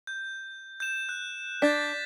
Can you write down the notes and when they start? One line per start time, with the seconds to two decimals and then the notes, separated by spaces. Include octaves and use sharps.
0.07 G6
0.80 G6 E7
1.09 F#6
1.62 D4 G6 A6 B6